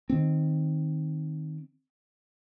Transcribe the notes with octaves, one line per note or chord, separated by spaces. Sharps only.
D#3 C4